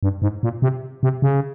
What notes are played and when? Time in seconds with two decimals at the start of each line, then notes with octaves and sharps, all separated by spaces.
0.03 G2
0.22 G#2
0.43 A#2
0.62 C3
1.03 C3
1.22 C#3